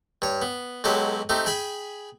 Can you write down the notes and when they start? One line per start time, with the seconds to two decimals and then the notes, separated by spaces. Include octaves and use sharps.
0.22 G2 C#5
0.42 B3
0.84 B1 F#3 G#3 G4 A4 B4
1.29 A3 C4 D#4 G4
1.46 G#4 G5 G#5 B5